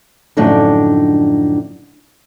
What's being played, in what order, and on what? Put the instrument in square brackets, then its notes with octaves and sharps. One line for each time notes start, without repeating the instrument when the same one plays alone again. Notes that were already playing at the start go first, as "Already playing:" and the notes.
[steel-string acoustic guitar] F#2 A2 D3 F3 D4 D#4